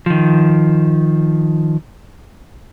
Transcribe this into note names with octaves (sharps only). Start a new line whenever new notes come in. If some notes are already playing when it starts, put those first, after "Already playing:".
D#3 F3